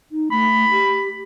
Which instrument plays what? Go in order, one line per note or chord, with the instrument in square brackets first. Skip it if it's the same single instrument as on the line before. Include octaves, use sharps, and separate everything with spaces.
[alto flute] D#4
[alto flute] A3 [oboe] B5
[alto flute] G4